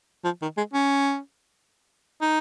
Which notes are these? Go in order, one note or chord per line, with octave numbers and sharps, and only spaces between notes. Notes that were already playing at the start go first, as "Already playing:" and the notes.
F3
D#3
G#3
C#4
D#4